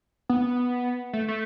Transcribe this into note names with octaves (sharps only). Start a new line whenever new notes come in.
B3
A3
A3